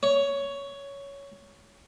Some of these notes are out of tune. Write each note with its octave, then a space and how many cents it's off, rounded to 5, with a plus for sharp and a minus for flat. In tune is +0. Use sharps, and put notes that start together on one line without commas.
C#5 +10